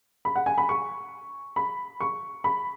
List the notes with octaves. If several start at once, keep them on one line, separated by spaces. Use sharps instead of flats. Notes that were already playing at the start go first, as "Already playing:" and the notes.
B5
F#5
G#5
B5
C#6
B5
C#6
B5